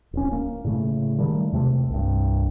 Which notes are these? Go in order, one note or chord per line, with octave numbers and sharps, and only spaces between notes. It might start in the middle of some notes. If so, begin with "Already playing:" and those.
D1 C#4
A#3
A2 C#3 A3
D#3 G3 A3 A#3
E2 C3 A3
C2 G2